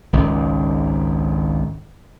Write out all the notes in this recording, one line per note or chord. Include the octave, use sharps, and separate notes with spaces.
G#1 C#2